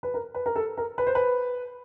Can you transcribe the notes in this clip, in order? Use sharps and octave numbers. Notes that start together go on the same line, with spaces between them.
B4
A#4
B4
A#4
A4
A#4
B4
C5
B4